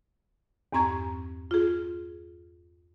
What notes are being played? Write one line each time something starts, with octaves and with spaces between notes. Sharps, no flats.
E2 G2 C4 A#5 C#6 G#6
F4 G#4